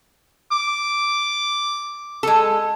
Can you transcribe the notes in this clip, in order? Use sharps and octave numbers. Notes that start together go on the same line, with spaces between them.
D6
G#3 A4